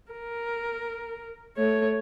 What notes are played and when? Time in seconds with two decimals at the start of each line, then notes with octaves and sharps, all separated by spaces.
0.12 A#4
1.57 A3 C#5